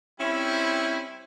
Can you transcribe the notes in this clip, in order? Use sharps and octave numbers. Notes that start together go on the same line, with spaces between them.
G3 C4 C#4 E4